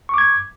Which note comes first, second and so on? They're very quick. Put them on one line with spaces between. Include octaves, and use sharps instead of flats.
C#6 D6 G#6